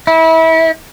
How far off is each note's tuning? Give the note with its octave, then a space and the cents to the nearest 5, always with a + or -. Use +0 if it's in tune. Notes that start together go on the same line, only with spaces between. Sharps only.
E4 -30